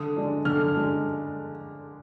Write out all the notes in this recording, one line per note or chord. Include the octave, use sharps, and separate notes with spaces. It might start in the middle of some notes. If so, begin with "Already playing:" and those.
Already playing: D3 D#6
G#3 D4
D3 F6
G#3 D4